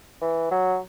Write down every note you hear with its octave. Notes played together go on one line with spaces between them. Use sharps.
E3
F#3